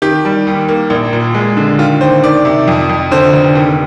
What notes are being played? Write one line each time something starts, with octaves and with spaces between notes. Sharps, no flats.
D#3 G4
G3
D#2
A#3
A#1
A#2
G#3
D3
D#2 F4
D#2 C5
D#3 D5
C3
F2
F2
D3 C5
F1
D#2